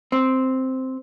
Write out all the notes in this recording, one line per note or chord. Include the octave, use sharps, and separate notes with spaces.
C4